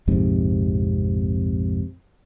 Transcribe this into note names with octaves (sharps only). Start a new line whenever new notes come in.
A#1 F2 G#2 C3